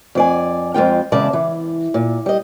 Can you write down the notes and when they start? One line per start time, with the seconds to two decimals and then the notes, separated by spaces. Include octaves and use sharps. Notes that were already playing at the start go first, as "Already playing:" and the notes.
0.15 F2 D5 G#5
0.74 F2 G#3 F4 G5
1.12 E2 C#3 G#3 D5 A5
1.33 E3
1.94 A#2
2.26 G3 D#5